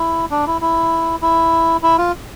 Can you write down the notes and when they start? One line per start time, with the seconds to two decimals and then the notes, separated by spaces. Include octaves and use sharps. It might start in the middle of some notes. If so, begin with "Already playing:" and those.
Already playing: E4
0.31 D4
0.47 E4
0.61 E4
1.22 E4
1.83 E4
1.98 F4